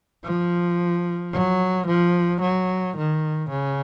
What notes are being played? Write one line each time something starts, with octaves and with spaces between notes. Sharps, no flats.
F3
F#3
F3
F#3
D#3
C#3